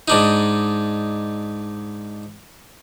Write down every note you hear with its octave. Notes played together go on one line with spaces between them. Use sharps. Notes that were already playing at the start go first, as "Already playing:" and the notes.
G#2 D4 D#4